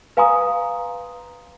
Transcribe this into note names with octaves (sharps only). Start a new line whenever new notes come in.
B4 F5 G#5 A#5 C6 D#6